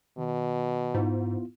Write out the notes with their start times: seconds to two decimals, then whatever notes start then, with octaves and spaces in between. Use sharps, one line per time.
0.18 B2 D#3
0.94 G#2 B3 E4 F4